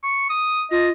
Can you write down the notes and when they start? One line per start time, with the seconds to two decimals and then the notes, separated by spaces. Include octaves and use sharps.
0.03 C#6
0.30 D#6
0.71 F4 D#5